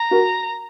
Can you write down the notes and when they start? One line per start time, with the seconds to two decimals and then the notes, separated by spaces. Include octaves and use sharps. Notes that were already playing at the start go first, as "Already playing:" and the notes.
Already playing: A#5
0.11 F#4 A#4